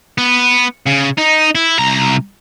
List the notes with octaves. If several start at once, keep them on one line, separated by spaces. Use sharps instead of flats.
B3
C#3
D#4
E4
C2 A#5